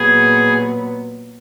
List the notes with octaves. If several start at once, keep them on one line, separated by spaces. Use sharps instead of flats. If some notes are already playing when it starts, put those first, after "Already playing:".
Already playing: A#2 F#3 B3 G#4